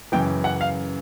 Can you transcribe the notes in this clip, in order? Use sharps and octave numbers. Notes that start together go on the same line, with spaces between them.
F#2 C#3 E3 G5
F#5
F5